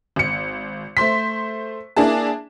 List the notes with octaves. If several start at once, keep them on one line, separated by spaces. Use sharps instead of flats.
G#1 C#7
A3 C5 C6 B6
A#3 D4 E4 G#4 A5